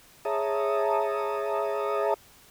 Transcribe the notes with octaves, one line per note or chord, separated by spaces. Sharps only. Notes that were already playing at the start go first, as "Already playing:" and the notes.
G#4 C#5 E5 A5 A#5 D#6